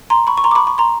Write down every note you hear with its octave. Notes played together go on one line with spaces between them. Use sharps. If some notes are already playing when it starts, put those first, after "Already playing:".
A#5 C6
B5 C#6
C#6
A#5 C6
D6
B5 C#6
B5 C#6
A#5 C6